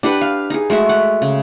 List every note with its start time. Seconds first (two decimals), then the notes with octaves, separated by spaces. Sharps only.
0.03 D4 G4 B4 F#5
0.21 F5
0.50 D#4 G#4
0.70 G#3 A3 F#4 E5
0.89 F#5
1.22 C#3